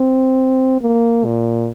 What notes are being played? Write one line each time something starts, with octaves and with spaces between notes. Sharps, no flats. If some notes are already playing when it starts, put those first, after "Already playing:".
Already playing: C4
A#3
A#2